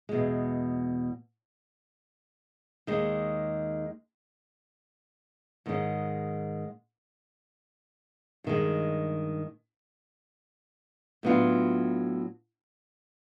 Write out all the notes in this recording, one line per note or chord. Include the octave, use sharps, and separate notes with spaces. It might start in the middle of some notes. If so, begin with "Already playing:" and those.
E2 B2 G#3
D#2 D#3 G#3
G#2 D#3 G#3 C#4
G2 D#3 G#3
A2 F#3 B3 D4 F4